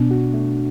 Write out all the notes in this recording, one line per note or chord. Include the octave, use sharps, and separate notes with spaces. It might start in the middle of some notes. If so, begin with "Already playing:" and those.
Already playing: B2 B3 D4
F#4
A3